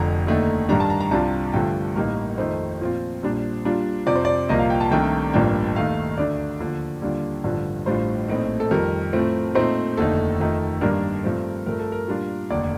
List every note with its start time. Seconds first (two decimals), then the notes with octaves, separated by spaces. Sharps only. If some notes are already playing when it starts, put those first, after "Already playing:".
Already playing: F1 F2 D3 A#5
0.27 D#2 D3 A3 D#4
0.69 G2 D#3 G3 D4 A#5
0.80 A5
0.90 A#5
1.00 A#5
1.11 C2 C3 G3 D4 F4 A5
1.53 G2 D3 F3 A3 G5
1.95 A1 A2 G3 A#3 D#4 A#4
2.38 F2 D#3 A3 D#4 C5
2.81 A#2 F3 C4 F4
3.22 A#1 A#2 G3 D4
3.65 A#2 G3 D4 F4
4.06 F2 C3 F3 D5
4.16 C5
4.25 D5
4.49 C2 A#2 F3 A#3 D#5
4.59 F5
4.70 G5
4.81 A5
4.91 C2 C3 D#3 A3 D4 G5
5.33 A1 G2 F3 A#3 D4 G5
5.75 D#2 D#3 A3 D#4 F5
6.18 D2 D3 A3 D4 D5
6.60 D#2 D3 F3
7.02 D#2 D3 G3 D4 F4
7.44 A1 G2 D3 F3
7.86 A1 A2 G3 D4 F4 C5
8.28 A#1 A2 A3 C4 D#4
8.60 A4
8.71 F2 D#3 G3 A#4
9.13 A2 F3 A3 C4
9.55 A#2 A3 C4 D#4 C5
9.97 F1 D#2 D3 A3 D#4 A4
10.40 F2 D#3 A3 D#4
10.81 G2 D#3 G3 A#3 D4 A#4
11.24 G2 F3 A3 C4
11.66 G2 F3 A3 A#4
11.79 A4
11.92 A#4
12.08 A#2 G3 D4 F4
12.50 F1 D#2 D3 D5